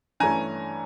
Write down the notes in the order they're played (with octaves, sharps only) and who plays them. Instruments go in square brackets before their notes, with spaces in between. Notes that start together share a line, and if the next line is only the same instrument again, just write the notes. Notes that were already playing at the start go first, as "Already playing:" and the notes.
[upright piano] G2 E3 A3 C#4 [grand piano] G#5 A#5